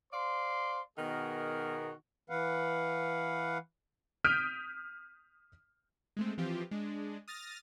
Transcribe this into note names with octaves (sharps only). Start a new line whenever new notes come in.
C5 D5 F5 C6
B2 D#3 B3 F#4 G#4 A#4
E3 B4 F5 F#5
D#6 F6 G6 B6 D7 D#7
G#3 A3 C4
E3 F3 C4 F4 G4
G#3 D4
D#6 F6 A6 A#6